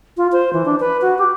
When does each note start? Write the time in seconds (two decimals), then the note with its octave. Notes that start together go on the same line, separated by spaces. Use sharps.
0.17 F4
0.32 C5
0.53 E3
0.65 D4
0.80 B4
1.02 F#4
1.19 G4